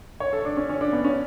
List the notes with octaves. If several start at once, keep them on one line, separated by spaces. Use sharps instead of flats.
C#5
A4
D4
C#4
C#4
D4
B3
C#4